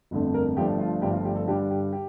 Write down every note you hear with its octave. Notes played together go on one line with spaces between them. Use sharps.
G1 F2 D3 A3
A#4
G1 G2 F3 A3 G4
F4
G1 G2 F3 A3 G4
F4
G4
A4
G2 D3 G3 D4 G4
G4
G4